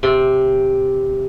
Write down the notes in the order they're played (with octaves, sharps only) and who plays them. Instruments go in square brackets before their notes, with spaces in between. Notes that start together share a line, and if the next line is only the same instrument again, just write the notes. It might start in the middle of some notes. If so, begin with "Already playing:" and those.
[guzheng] C3